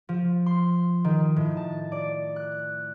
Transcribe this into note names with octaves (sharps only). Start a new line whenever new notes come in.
F3
C6
D#3
A2
A5
D5
F#6